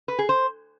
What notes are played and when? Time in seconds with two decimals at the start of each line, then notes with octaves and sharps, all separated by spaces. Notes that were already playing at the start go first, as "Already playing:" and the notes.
0.08 B4
0.19 G#4
0.29 C5